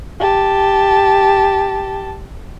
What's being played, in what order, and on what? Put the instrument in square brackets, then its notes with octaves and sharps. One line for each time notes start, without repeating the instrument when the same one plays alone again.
[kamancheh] G4 A5